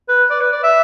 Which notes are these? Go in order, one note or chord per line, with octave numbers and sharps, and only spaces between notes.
B4
D5
B4
D5
E5